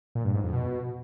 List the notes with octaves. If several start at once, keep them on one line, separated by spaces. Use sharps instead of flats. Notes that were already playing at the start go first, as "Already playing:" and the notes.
A#2
G2
G#2
F2
B2